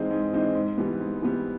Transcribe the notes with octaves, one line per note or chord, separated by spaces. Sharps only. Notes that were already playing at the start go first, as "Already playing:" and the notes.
Already playing: G#2 E3 G#3 C4 D#4
G#2
E3 G#3 C4 D#4
G#2
E3 G3 B3
G#2
E3 G3 B3